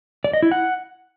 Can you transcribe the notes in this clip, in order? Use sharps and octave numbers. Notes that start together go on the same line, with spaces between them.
D5
D#5
E4
F#5